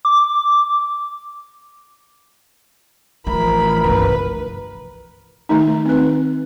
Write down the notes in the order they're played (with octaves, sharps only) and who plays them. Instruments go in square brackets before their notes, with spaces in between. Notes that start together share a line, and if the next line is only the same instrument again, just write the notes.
[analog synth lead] D6
[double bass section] A1 E3 F3 [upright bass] A3 [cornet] A#4 [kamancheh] B5
[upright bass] G1 C2 [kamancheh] B4
[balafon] D#3 A3 D#4
C4 B4